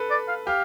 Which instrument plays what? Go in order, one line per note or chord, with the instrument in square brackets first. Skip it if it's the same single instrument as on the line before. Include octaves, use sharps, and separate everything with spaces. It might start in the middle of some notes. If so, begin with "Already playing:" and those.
Already playing: [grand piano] A4 B4
[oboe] D5
F5
[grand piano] G4 [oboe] F5